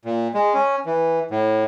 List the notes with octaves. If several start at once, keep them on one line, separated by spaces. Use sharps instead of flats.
A#2
G#3
C#4
E3
A2